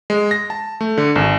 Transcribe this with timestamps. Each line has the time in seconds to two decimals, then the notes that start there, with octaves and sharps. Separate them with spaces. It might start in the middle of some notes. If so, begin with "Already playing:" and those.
0.10 G#3
0.31 A#6
0.50 A5
0.81 A3
0.98 D3
1.16 G#1